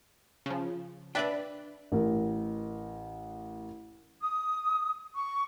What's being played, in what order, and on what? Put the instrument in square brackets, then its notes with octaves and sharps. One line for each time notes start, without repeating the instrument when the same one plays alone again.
[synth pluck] C#3 F3
[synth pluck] D4 B4 [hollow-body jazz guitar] D5 E5 G5
[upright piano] A1 A#4
[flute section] D#6
C#6